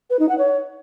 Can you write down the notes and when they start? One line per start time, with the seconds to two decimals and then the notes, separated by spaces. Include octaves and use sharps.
0.10 B4
0.19 D#4
0.29 F#5
0.38 C#5